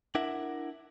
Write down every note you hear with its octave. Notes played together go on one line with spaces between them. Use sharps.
D4 E4 A#4 E5 F#5